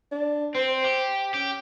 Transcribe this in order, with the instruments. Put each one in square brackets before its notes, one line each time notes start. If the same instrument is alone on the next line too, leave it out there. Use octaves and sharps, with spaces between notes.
[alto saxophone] D4
[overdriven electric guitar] C4 [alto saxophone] C5
[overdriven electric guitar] G4
[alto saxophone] C#4 [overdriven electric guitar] G4